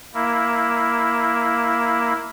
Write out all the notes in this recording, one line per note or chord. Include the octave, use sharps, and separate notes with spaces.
A#3 E4